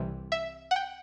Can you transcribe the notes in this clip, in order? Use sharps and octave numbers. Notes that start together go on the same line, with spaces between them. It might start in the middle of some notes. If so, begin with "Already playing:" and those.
Already playing: C2 C3 E3 G3 C4
E5
F#5
G5